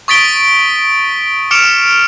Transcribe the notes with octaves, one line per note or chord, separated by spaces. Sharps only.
C#6 D#6 A6 B6 D7 G7
D6 F6 C#7 D7 E7 F7